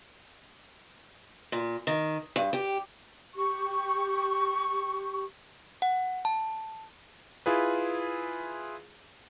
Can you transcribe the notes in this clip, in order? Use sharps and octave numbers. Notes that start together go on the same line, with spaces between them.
A#2
D#3
G2
G4
G4 C#6
F#5
A5
E4 F4 G#4 B4